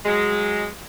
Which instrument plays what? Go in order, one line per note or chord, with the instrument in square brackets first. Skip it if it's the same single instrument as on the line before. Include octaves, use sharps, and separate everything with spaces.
[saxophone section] F#3 G#3